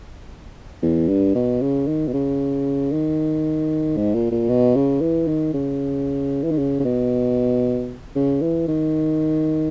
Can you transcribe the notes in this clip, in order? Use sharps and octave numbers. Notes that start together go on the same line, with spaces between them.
E2
G2
B2
C#3
D#3
B2
C#3
D#3
G#2
A#2
A#2
B2
C#3
E3
D#3
C#3
E3
D#3
C#3
C#3
B2
C#3
E3
D#3